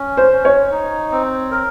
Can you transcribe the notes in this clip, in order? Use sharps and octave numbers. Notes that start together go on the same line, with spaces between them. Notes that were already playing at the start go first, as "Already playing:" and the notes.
Already playing: C#4
C5
C#4
C#5
D#4
C4
A#4